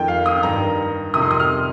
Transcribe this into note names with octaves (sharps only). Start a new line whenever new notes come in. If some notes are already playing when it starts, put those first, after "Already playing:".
Already playing: F2 D#3 G5
F5
D#6
G2 D#3 A#5
F2 C3 D#3 D#6
C6
D#6
F6